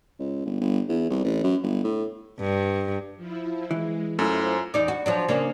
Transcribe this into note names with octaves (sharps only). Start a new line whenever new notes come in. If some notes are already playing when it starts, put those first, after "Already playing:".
C#2
G1
G1
E2
C2
A1
F#2
G1
A2
G2
F3 E4
E3 G#3
F#2 A3 E4 F4 C5
E2 D#4 D5
F#4
F3 F#3 D4
C#3 A#3 D4